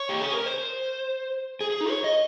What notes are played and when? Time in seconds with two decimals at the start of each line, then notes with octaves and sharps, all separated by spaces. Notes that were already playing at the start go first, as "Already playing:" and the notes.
Already playing: C#5
0.09 G4
0.21 G#4
0.33 A#4
0.46 C5
1.61 G#4
1.71 G#4
1.81 D#4
1.89 C#5
2.04 D#5